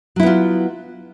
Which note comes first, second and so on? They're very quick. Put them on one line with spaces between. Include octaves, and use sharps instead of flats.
F#3 E4 B3 F4